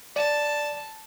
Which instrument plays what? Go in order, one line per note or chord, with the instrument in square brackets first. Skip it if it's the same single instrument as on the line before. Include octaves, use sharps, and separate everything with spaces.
[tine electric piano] D5 [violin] A5